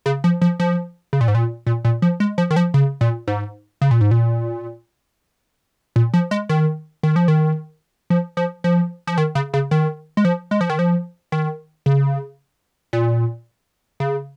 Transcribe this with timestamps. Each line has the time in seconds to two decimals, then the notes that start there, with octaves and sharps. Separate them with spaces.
0.06 C#3
0.24 F3
0.42 F3
0.60 F3
1.13 C#3
1.21 A#2
1.28 G#2
1.35 A#2
1.67 A#2
1.85 A#2
2.02 F3
2.20 G#3
2.38 F3
2.51 D#3
2.56 F3
2.74 C#3
3.01 A#2
3.28 G#2
3.81 C#3
3.91 A#2
4.01 G#2
4.11 A#2
5.96 A#2
6.14 F3
6.31 G#3
6.49 D#3
7.03 D#3
7.16 F3
7.28 D#3
8.10 F3
8.37 F3
8.64 F3
9.07 F3
9.18 D#3
9.35 C#3
9.54 C#3
9.71 D#3
10.17 G#3
10.25 F3
10.51 G#3
10.61 F3
10.70 D#3
10.79 F3
11.32 D#3
11.86 C#3
12.93 A#2
14.00 C#3